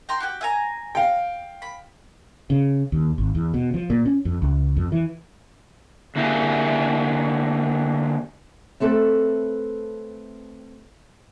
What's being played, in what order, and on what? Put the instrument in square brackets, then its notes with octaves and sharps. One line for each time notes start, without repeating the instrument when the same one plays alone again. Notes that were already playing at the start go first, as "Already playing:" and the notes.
[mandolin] G5 A#5 C6
F#4 G4 G5
E5 G#5 A#5
[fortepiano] F5 G5
[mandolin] B5
[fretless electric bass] C#3
D#2
G#1
E2
B2
F3
A#2
C#4
F2
C#2
F2
E3
[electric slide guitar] D3 A#3 E4 G4 G#4
[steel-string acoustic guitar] A3 C4 A4 B4